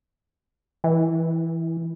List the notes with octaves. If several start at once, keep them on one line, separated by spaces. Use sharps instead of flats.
E3